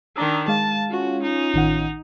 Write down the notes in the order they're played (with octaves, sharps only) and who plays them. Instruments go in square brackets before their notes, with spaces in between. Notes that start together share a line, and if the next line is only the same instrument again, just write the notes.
[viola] D#3 D4 [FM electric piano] A#5 D#6 E6
[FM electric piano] G#3 F5 [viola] A5
[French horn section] C#4 F4 [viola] F#4
[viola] D#4
[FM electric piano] A1 D#3 F#5